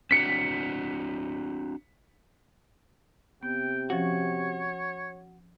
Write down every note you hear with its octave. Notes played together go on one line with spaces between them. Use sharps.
C4 D4 F#4 B6 C#7
C3 B3 G5
F3 C#4 F#4 C#5